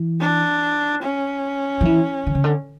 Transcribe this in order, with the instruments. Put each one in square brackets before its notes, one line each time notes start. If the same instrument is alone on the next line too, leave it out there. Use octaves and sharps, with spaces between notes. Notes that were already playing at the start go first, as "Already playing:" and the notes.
Already playing: [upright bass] E3
[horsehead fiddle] D4
C#4
[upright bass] F3
E3
D3
C#3
D3